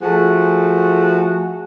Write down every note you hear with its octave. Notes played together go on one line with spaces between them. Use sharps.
F3 A3 F#4 G#4